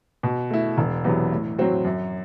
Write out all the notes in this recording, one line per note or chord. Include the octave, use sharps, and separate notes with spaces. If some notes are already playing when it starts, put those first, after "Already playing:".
B2
A3 E4
E1
E2 C3 F#3 B3
A2
F#3 C4 F#4
F#2